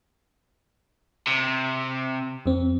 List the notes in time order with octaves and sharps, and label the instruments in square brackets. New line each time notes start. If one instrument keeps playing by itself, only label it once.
[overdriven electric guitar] C3
[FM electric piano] F2 C4